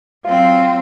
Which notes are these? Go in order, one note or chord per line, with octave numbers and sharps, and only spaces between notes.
F#3 C4 F4